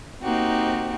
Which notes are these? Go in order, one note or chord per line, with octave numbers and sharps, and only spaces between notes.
A#3 C4 D#4 F#4 G4